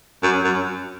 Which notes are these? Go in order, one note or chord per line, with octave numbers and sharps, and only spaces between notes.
F#2
F#2